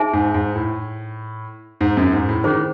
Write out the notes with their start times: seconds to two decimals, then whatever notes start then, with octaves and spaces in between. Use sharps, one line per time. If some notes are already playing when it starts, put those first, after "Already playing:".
Already playing: D#4 G#4 C5 E5 G#5
0.13 G#2
0.34 G#2
0.55 A2
1.81 G#2
1.97 F#2
2.12 G#2
2.28 A2
2.44 D#3 C#4 G#4 C5